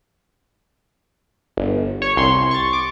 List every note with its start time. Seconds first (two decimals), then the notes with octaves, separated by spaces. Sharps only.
1.57 G1
2.02 C#5 C#6
2.16 C2 C6
2.51 C#6 A6
2.73 D6